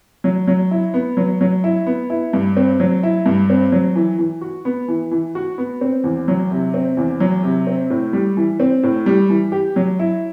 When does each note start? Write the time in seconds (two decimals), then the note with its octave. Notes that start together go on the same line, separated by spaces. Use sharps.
0.24 F#3
0.48 F#3
0.71 E4
0.94 B3
1.17 F#3
1.41 F#3
1.64 E4
1.87 B3
2.10 E4
2.33 G2
2.56 C4
2.80 F#3
3.03 E4
3.26 G2
3.50 C4
3.72 F#3
3.95 E3
4.18 E3
4.41 F#4
4.65 B3
4.88 E3
5.11 E3
5.35 F#4
5.58 B3
5.81 C4
6.04 E2
6.28 F#3
6.51 C3
6.74 C4
6.97 E2
7.20 F#3
7.43 C3
7.67 C4
7.90 A2
8.13 G3
8.37 E3
8.60 C4
8.83 A2
9.06 G3
9.30 E3
9.52 G4
9.76 F#3
9.99 E4